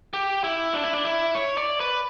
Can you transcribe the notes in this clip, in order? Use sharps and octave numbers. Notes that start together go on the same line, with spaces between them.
G4
E4
D4
E4
D4
E4
C#5
D5
B4